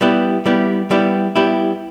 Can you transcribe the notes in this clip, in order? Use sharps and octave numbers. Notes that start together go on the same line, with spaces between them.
G3 B3 E4 G4
G3 B3 E4 G4
G3 B3 E4 G4
G3 B3 E4 G4